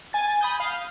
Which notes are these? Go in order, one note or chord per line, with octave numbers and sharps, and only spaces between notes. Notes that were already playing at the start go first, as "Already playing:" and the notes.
G#5 A6
B5 D#6 G6
F5